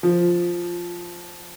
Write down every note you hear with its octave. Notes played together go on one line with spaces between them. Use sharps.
F3